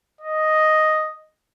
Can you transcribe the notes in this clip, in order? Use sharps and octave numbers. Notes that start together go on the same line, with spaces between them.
D#5